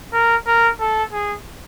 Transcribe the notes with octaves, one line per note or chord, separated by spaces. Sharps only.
A#4
A#4
A4
G#4